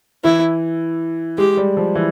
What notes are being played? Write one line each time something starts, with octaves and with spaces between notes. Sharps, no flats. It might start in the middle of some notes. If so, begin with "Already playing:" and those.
E3 E4
G#3 G4
G3
F3
E3